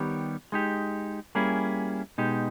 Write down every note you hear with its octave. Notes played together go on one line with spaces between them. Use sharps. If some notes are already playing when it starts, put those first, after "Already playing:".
Already playing: D#3 G3 B3 G4 C#5
G#3 D#4 G4
G3 A#3 C#4 E4 G#4
B2 G#3 D#4 G4